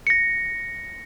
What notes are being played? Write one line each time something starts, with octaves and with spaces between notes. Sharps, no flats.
A#6 C#7